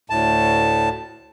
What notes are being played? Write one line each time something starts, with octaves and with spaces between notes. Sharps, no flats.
D2 A2 A5